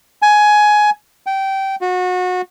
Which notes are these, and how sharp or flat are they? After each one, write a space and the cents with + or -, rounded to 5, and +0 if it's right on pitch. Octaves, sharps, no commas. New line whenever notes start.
G#5 +15
G5 -20
F#4 -25